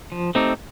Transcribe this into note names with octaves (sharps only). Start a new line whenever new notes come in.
F3
A3 C4 D#4 G4